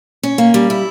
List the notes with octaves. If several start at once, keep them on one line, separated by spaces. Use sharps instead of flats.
C#4
A#3
G3
E4